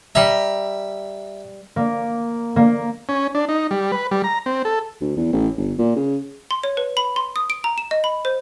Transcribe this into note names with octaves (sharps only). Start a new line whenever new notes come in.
G3 E5 A#5
A#3
A#3
C#4
D4
D#4
G3
B4
G3
A#5
C4
A4
D2
E2
A1
G1
A#2
C#3
C6
C#5
B4
B5
C6
D#6
D7
A#5
E7
D#5
B5
C5